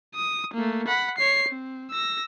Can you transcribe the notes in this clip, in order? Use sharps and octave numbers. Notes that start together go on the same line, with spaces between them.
D#6
A3 A#3
F#5 B5
C#5 C7
C4
E6 A#6